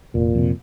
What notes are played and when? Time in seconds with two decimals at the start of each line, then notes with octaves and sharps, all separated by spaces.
0.14 F1 A#2
0.35 F2 C3